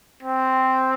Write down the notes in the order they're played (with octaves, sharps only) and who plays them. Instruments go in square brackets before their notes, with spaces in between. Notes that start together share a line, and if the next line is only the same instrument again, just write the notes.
[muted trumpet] C4